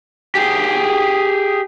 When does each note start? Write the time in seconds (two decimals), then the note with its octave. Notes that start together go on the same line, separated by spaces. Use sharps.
0.35 G4 G#4